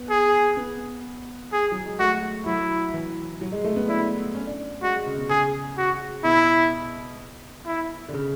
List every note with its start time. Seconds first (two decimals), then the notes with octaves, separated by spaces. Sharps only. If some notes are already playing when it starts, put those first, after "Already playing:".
Already playing: B3
0.10 G#4
0.57 B3
1.52 G#4
1.71 F#3
1.86 G#3
1.99 A3 F#4
2.46 F#3 E4
2.94 E3
3.41 F#3
3.52 G#3
3.64 A3
3.76 B3
3.88 D4 E4
4.35 C#4
4.47 D4
4.82 G#3 F#4
4.94 G#3
5.06 C#3
5.18 B2
5.29 C#3 G#4
5.77 F#4
6.24 B2 E4
7.66 E4
8.09 D3
8.14 C#3